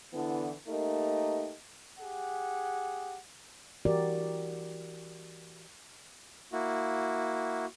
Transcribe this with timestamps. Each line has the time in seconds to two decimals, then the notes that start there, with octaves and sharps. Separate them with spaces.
0.13 D3 E3 B3
0.67 A3 A#3 D#4 G4 A#4 D#5
1.99 G4 G#4 F#5
3.85 E3 F#4 G4 A#4 D5
6.53 A#3 E4 F#4